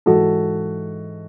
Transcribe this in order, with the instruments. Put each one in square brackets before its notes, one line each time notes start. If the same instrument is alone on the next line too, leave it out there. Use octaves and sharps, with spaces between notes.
[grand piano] G#2 E3 F#4 A4